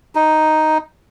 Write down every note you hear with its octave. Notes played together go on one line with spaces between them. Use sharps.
D#4